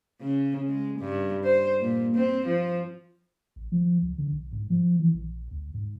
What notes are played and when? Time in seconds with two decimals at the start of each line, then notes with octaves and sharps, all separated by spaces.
0.21 C#3
0.68 G#3
0.99 G2
1.44 C5
1.80 A#2
2.15 C4
2.46 F3
3.56 A1
3.72 F3
4.02 C#2
4.18 D3
4.32 B1
4.53 G#2
4.70 F3
5.00 E3
5.14 A#1
5.51 D2
5.74 G#2